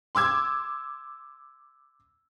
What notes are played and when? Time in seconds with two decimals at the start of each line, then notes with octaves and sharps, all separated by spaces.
0.15 C6 D6 E6 G#6